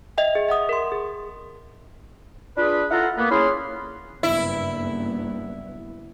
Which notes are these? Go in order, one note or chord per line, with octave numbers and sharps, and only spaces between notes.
D#5 E5 G5
G#4
E5 F#5 D#6
A#4 C6
G#4
D4 F4 G#4 B4
E4 F4 A4 F5 F#5 A#5
A#3 B3
C#4 E4 G#4 B5 C6 F6
F#1 G2 B3 E4